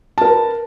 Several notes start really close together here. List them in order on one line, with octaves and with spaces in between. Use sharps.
A5 A#4 B4